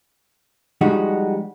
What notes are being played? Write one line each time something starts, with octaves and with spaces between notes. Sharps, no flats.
F3 G3 G#3 D#4 F#4